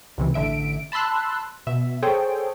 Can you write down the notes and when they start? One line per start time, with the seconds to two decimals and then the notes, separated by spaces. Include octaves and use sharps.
0.18 C#2 C3 E3
0.34 A1 D3 E5 D7
0.92 A5 B5 C6 E6 F#6
1.67 B2 E5
2.02 G#4 A4 C5 C#5 G5